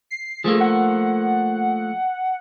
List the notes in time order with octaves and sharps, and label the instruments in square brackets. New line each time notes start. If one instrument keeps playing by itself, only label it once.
[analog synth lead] C7
[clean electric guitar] F3 A3 A#3 [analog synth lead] G#4
[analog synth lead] F#5